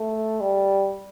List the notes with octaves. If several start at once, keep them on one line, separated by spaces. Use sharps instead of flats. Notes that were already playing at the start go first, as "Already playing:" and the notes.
Already playing: A3
G3